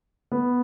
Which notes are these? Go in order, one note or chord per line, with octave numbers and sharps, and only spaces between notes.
B3